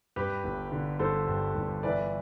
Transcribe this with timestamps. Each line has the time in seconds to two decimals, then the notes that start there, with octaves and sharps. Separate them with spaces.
0.16 G2 G4 B4
0.44 G1
0.72 D3
0.99 G1 A4 C5
1.27 G2
1.55 G1
1.83 E3 B4 D5